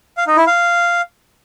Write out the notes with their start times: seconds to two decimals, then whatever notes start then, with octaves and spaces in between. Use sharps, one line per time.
0.17 F5
0.27 D#4
0.37 E4
0.47 F5